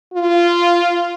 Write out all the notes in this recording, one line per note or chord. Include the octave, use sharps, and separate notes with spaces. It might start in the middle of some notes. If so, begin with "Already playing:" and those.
F4